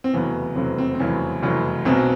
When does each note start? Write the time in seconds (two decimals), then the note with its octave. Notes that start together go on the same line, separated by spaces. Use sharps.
0.04 C4
0.13 F1 E2 C#3 F#3 B3
0.56 F1 E2 C#3 F#3 C4
0.78 C4
0.95 C4
0.99 F1 E2 C#3 F#3 C#4
1.43 F1 E2 C#3 F#3
1.85 B1 B2 F#3 C4